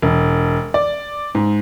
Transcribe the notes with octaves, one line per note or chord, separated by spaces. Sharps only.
E1
D5
G#2